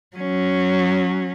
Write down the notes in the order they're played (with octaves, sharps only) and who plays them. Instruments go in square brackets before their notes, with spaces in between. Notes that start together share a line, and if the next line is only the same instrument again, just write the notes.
[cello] F#3 C#4